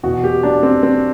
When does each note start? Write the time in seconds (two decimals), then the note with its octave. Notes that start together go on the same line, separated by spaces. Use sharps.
0.03 E2 B2 F#4
0.24 G4
0.43 D4
0.63 C4
0.83 C4